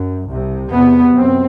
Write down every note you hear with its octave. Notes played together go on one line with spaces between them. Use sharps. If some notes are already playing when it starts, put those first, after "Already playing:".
Already playing: F#2
C2 C3
E2 C3 B3
F#2 C4